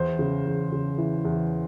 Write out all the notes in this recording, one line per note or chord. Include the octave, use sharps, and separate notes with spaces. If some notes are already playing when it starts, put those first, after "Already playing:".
Already playing: E2 C5
C#3
E2
C#3
E3
E2